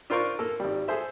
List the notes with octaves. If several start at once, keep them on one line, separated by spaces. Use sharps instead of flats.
D4 F4 A#4 C5 D5 C#6
A#3 A4
G#1 G3
G#4 A4 C5 E5